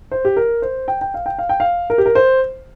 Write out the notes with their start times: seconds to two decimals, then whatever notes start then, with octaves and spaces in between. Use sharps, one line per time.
0.11 C5
0.25 G4
0.37 A#4
0.62 C5
0.88 G5
1.01 G5
1.14 F5
1.26 G5
1.39 F5
1.49 G5
1.60 F5
1.90 A#4
1.98 G4
2.06 A#4
2.15 C5